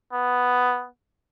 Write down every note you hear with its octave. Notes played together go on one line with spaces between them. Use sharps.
B3